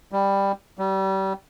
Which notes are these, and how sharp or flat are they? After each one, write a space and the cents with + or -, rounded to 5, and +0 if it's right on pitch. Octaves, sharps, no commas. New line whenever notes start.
G3 +10
G3 -30